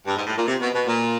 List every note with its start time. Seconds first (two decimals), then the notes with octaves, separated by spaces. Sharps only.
0.06 G2
0.16 G#2
0.27 A2
0.36 A#2
0.46 C3
0.61 B2
0.73 B2
0.86 A#2